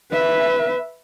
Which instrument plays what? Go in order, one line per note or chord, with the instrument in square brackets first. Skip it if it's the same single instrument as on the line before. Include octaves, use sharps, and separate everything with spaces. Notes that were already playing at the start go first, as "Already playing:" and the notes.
[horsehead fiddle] B4 E5